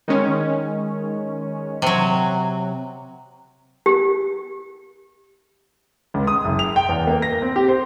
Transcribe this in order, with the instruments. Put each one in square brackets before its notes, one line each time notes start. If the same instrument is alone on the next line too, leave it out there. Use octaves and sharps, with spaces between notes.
[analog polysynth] D#3 G#3 C#4
[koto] C3 F#3
[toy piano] G4
[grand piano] C#2
D#6
F#1
F7
G5
E2
A#3
A#6
C4
G4
C5